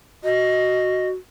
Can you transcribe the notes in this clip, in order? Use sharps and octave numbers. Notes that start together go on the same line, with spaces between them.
F#4 D#5